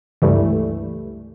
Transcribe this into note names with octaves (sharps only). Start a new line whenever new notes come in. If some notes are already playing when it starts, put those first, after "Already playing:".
C#2 G2 E3 G3 A3